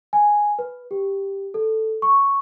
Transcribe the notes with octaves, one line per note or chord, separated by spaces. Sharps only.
G#5
B4
G4
A4
C#6